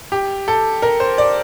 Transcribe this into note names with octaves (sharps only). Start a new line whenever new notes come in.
G4
A4
A#4
C5
D5